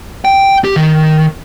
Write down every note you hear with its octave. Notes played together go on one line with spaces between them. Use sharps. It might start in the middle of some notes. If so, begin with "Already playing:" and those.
G5
G4
D#3